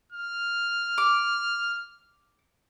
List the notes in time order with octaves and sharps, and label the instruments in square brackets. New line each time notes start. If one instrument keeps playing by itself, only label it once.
[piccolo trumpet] F6
[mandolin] D6